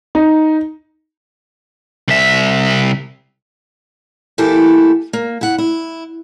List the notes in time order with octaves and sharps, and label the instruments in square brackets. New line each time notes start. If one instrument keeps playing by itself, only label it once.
[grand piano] D#4
[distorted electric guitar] C2 E5
[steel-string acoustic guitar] E3 A#3 E4 G4 A4
A#3
E4 F#5
E4